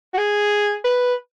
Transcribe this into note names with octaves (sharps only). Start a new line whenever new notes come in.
F#4
G#4
B4